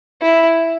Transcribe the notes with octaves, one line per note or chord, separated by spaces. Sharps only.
E4